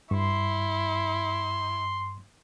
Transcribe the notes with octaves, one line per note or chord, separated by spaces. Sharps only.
G2 E4 C6